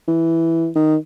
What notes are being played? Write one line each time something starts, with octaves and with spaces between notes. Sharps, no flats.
E3
D#3